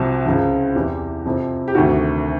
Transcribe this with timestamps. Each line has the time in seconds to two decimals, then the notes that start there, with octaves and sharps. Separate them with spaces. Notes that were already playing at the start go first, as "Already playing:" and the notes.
Already playing: C2 C3 F3 F#4
0.26 C#2 C#3 F3
0.75 E2 C3 E3 G4
1.25 F2 C3 F3
1.68 G4
1.75 D2 C3 D#3 F#4